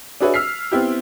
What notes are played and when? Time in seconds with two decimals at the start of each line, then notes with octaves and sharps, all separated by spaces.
0.20 D4 F#4 G#4 B4 C#5 E5
0.34 E6 F6 B6 C7
0.72 B3 C4 E4 G4